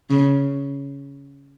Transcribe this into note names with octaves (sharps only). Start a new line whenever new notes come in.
C#3